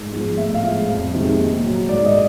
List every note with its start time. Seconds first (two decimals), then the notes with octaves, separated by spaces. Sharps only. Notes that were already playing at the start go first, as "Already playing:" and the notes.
Already playing: G#2
0.12 F3 G#3
0.37 A2 E5
0.54 F5
0.63 F3 G#3
0.88 F2
1.14 C3 D#3 G#3
1.38 A#2
1.63 F#3
1.88 G#2 D5
2.06 D#5